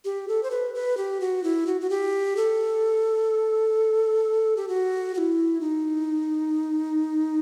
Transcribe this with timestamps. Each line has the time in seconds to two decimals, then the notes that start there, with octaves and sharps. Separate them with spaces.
0.05 G4
0.28 A4
0.43 C5
0.51 B4
0.74 B4
0.97 G4
1.20 F#4
1.43 E4
1.67 F#4
1.81 F#4
1.90 G4
2.37 A4
4.57 G4
4.68 F#4
5.14 F#4
5.18 E4
5.61 D#4